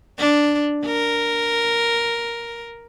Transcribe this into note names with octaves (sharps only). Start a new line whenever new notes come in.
D4
A#4